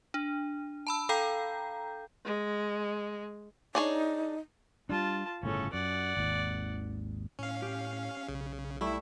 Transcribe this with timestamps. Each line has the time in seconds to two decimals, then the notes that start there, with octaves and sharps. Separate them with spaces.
0.14 D4
0.87 A5 B5 E6
1.09 A4 F5 G5 A#5 G6
2.25 G#3
3.75 D4 D#4 G#4 C#5
4.89 G3 D4 F4 A5
5.43 G1 A2 C#3 C#4 A4
5.73 F#2 D5 F#5
6.17 G#1 D#2
7.39 A2 C#4 F5
7.62 G4
8.28 B1 C#3
8.81 G3 A3 E4 E5